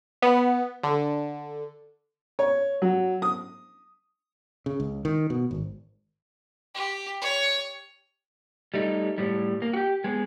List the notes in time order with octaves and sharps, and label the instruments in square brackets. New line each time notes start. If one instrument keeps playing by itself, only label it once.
[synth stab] B3
D3
[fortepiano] C#5
F#3
D#6
[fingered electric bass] C#3
C#2
D#3
B2
G#1
[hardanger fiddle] G4
C#5
[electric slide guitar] G3 A3 D#4
A2 G3
A#3
F#4 G4
G#3 B3